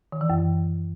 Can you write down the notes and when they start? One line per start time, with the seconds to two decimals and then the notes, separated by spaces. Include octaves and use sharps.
0.12 D#3
0.21 E3
0.30 F#2